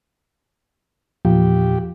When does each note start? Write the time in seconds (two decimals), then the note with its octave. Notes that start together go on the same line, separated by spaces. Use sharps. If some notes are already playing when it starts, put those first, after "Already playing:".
1.25 E2 A#2 F3 G4